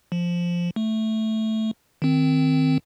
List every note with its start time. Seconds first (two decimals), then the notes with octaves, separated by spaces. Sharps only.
0.12 F3
0.76 A3
2.02 D#3 C4